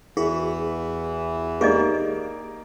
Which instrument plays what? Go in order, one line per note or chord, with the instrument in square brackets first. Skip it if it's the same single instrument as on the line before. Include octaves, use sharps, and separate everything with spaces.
[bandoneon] E2 E3 [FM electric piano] E4 F#4 B4 [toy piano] G#4
[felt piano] A#3 D#4 [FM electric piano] G4 [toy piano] G#4 D5 D#5